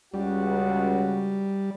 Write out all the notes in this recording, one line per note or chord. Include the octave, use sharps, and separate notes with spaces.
C#2 G3 F#4